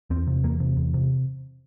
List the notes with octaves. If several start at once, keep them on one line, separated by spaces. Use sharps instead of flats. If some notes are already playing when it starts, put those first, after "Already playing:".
E2 C4
C3
E2 A#3
C3
E2
C3